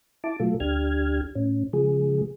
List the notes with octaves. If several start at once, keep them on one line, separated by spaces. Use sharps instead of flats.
E4 A5 D6
B2 F#3 A3 F4 A4
D2 D4 G4 F6 G#6
A2 C#4
C#3 F3 G#3 G#4